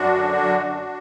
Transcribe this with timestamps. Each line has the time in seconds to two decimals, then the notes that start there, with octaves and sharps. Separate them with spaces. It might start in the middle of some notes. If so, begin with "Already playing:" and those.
Already playing: F#2 D4 F#4
0.15 D3
0.38 F#2
0.62 F#2